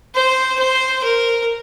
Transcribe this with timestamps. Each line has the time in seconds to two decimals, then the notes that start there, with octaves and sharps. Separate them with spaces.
0.15 C5
0.59 C5
1.03 A#4